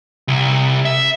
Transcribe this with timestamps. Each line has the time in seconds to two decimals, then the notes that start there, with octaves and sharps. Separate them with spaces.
0.28 C2
0.85 E5